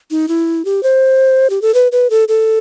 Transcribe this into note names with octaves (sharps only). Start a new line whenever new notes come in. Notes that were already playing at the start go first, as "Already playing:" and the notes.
D#4
E4
G4
C5
G4
A4
B4
B4
A4
A4